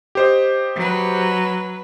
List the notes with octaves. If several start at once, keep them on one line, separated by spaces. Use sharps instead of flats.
G4 C5 D#5
F#3 B4